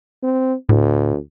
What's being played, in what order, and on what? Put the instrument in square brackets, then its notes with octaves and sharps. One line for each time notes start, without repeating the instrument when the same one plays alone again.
[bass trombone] C4
[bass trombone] D2 [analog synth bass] A2